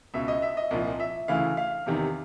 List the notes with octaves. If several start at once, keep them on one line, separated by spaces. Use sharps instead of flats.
C#2 B2 E5
D#5
E5
D#5
C2 A#2 F3
E5
D2 C#3 E3 F5
F5
E2 C3 D#3